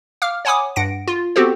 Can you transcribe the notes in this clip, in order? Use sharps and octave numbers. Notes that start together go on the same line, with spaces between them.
F5 D6 F6
C#5 F#5 G#5 B5 D6 D#6
G2 F#5 A#6 D7
F4
B3 C4 F#4 G4 A4 C5